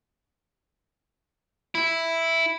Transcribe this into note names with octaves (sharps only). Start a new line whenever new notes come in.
E4